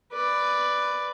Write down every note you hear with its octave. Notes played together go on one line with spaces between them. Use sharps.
B4 D5